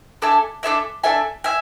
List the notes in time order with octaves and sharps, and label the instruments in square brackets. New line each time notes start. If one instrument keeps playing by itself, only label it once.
[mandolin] D4 A4 E5 G#5
D4 A4 E5 G#5
D4 A4 E5 G#5
E5 G#5